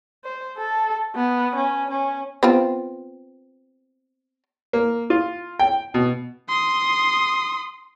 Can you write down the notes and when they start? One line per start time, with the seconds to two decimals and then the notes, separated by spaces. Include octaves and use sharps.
0.24 C5
0.58 A4
1.15 B3
1.56 C#4
1.90 C#4
2.43 B3 C4 F4
4.73 A#3
5.10 F4
5.59 G5
5.94 B2
6.49 C6 D#6